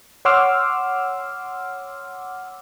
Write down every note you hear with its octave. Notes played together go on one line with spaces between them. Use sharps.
C#5 F#5 C6 D6 E6 F6